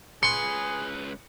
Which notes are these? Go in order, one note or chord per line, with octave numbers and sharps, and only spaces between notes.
C#2 G#4 B4 C6 C#6 C#7